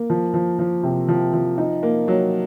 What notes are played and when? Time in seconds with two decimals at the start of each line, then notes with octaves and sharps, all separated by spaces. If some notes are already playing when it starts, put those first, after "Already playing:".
Already playing: A#3
0.10 F3
0.34 F3
0.59 F3
0.83 C3
1.09 F3
1.33 F3
1.58 D#4
1.83 A#3
2.08 F#3